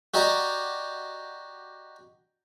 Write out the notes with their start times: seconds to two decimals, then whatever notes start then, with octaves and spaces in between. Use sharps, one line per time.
0.14 F#4 G4 D5 D#5 A#5